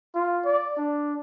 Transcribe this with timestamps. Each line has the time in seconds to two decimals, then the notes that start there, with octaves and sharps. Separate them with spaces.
0.15 F4
0.45 D5
0.78 D4